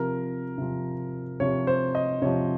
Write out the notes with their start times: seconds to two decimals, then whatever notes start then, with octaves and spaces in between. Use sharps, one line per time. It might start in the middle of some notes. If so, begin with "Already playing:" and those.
Already playing: C3 F3 A#4
0.58 C3 F3
1.40 C3 F3 C#5
1.67 C5
1.95 D#5
2.22 C3 F3 C#5